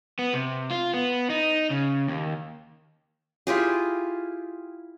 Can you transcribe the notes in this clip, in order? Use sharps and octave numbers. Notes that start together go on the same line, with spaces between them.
B3
C3
F4
B3
D#4
C#3
D#2
E4 F4 G4 G#4